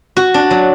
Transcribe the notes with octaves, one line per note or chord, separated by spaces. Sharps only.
F#4
D4
F#3